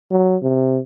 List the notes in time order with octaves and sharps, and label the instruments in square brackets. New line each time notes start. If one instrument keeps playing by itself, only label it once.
[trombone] F#3
C3